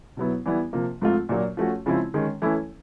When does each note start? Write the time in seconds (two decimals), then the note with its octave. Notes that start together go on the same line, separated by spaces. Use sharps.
0.17 B2 F#3 B3 E4
0.46 E3 G3 B3 E4
0.73 C3 F3 A#3
1.02 G#2 F3 A3 C4 F4
1.29 A#2 F#3 A#3 D4
1.57 F3 A3 C#4 F#4
1.86 C#3 F3 G#3 C4 E4
2.14 D#3 G#3 C#4
2.42 E3 A3 C#4 E4 A4